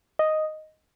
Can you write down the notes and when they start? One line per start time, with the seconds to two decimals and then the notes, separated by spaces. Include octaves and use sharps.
0.19 D#5